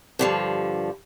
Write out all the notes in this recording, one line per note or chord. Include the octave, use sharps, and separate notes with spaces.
G2 D3 F3